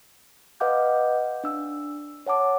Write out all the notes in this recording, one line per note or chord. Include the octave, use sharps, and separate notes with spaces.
B4 D#5 F5 F#5 D6 G6
D4 E6
C#5 F#5 A5 D6